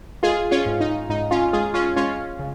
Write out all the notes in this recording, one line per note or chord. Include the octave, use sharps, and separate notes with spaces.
G#3 F4 G#4
C#4 F4
G#2
D#4
G#2 D#4
C#4 F4
G#3 F4 G#4
C#4 F4
G#3 C#4 F4
C#3